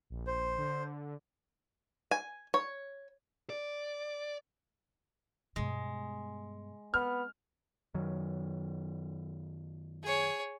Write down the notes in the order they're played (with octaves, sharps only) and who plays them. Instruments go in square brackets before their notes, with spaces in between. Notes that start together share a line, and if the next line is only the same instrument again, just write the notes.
[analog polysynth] A#1
[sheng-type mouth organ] C5
[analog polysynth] D3
[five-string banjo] G#5
C#5
[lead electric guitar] D5
[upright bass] G2 B2 [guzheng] G#3
[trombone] B3 [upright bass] C4 [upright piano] F6
[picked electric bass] F#2 D#3 F#3
[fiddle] G#4 C#5